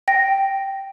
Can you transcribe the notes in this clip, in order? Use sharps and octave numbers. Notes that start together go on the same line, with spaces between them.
G5 A#6